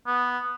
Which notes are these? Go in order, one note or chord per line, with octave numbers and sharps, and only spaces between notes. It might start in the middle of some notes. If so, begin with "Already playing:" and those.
B3